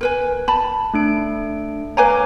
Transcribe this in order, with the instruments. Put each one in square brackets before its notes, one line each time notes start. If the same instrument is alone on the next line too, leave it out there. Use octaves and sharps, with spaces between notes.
[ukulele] A#4 B4 G#5
A5 B5
[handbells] A3 D4 D7
[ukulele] B4 G#5 A#5 [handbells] C#5 F5 D6